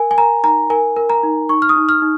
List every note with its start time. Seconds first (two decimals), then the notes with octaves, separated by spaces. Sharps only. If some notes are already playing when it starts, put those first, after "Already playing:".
Already playing: A#4 G#5
0.11 G#5
0.18 A#4 A#5
0.43 D#4 A#5
0.70 A#4 G#5
0.96 A#4
1.10 A#5
1.23 D#4
1.49 D#4 C#6
1.62 F6
1.69 D#6
1.76 D#4
1.89 F6
2.02 D#4